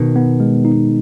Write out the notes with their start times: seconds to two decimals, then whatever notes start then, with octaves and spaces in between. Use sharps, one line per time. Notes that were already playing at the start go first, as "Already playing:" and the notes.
Already playing: B2 D#3
0.16 B3
0.40 G#3
0.65 D#4